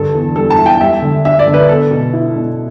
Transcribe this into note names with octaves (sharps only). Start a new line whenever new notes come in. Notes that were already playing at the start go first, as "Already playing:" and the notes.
Already playing: G2 D3 A4
E2
G3 A4
A5
E4
G5
G3 E5
D3
D4 E5
D5
D3
B4
B3 A4
B2
E4
B2